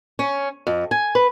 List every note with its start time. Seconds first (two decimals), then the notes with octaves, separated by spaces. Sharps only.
0.19 C#4
0.67 F2
0.91 G#5
1.15 B4